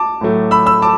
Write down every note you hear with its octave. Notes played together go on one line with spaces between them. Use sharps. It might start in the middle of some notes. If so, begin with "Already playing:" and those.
Already playing: A5 D6
A2 F#3 A3
B5 E6
B5 E6
A5 D6